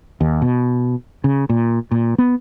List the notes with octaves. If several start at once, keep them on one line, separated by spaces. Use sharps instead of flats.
D#2
B2
C#3
A#2
A#2
B3